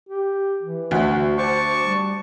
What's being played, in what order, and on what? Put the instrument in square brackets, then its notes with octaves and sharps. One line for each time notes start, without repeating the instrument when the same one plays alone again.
[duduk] G4
E3
[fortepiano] D2 [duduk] F#4
[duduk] C5 [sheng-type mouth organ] A5 C#6 D6
[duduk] G3